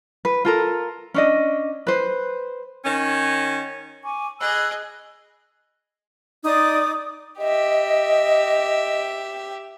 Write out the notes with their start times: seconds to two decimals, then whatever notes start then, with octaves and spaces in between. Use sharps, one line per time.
0.25 B4
0.45 F4 A4 A#4
1.14 C#4 D4 D#5
1.87 B4 C5
2.85 D#3 C#4
4.04 G#5 C#6 D6
4.40 G#4 D#5 B5 E6 F#6
6.45 D#4 D5 D6 D#6
7.39 G4 D#5 E5